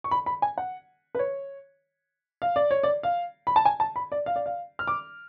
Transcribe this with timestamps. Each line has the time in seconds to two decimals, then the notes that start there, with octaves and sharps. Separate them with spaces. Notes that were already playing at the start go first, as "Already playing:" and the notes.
0.04 C#6
0.11 B5
0.26 B5
0.42 G#5
0.58 F#5
1.15 B4
1.19 C#5
2.42 F5
2.56 D5
2.71 C#5
2.83 D5
3.03 F5
3.47 B5
3.56 A5
3.65 G#5
3.80 A5
3.96 B5
4.12 D5
4.26 F5
4.36 D5
4.46 F5
4.79 F6
4.87 D6